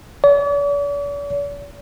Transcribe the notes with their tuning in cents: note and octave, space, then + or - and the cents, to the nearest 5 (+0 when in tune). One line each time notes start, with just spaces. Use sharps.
D5 -45